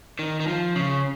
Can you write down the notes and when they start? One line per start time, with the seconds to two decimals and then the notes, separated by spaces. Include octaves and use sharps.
0.19 D#3
0.40 D#3
0.47 F3
0.75 C#3